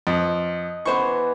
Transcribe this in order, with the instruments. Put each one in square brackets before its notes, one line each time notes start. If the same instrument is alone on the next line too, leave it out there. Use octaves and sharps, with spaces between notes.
[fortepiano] F2 [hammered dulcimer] D#5
[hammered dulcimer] E3 B3 [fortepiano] C5 C#6